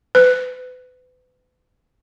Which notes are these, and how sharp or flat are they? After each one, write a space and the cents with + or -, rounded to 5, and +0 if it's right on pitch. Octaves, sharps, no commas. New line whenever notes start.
B4 +35